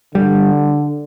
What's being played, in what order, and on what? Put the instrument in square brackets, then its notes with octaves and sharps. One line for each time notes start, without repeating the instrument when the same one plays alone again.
[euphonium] D3 [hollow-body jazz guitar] G3